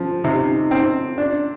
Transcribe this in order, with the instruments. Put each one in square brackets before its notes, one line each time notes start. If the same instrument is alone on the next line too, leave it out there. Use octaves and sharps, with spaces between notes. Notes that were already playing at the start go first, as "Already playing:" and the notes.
Already playing: [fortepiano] F3
[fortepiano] C3 [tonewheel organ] D#4
[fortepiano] C4
D4